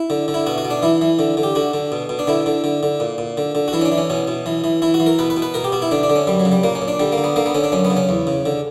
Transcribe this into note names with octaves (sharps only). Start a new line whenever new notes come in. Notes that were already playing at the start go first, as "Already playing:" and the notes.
Already playing: E4
D3
D3
E4
B2 F#4
F#4
B2
D4
E3 E4
E3
D3
D3
G4
D3 F#4
D3
B2
B2
D4
D3 E4
D3
D3
D3
A#2
A#2
D3
D3
F#4
E3 E4
C#4
D4
E3
C#4
B2 C#4
B2
E3
E3
E3 E4
F#4
E3
A#4
B2 B4
B4
B2
B4
B2 A#4
G4
B2 F#4
E4
D3 D4
D4
D3
C#4
F#2 G3
F#3
C#3
G3
A#2 A#3
C#4
A#2
D4
D3 G3
A#3
D3
B3
D3 A#3
B3
D3 C#4
D4
F#2 C#4
B3
C#3
C#4
E2
C#3
D3